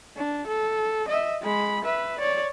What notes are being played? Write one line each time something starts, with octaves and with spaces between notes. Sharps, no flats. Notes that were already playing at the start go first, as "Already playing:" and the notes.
D4
A4
D#5 E5
G#3 B5
B4 E5
C#5 D5